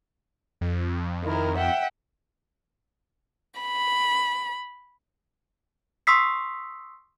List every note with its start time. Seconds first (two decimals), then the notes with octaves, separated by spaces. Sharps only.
0.61 F2
1.24 D#3 E4 A#4
1.57 E5 F#5 G5
3.60 B5
6.07 C6 C#6 D#6 E6 B6 C7